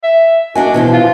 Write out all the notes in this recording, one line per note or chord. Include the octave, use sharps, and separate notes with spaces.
E5
D4 F#4 D#5 G#5
B2 E3 F3
F4